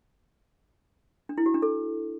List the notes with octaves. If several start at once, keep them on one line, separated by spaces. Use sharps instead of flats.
D4
E4
F#4
D4
A4